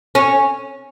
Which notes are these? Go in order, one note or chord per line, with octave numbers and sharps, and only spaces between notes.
C#4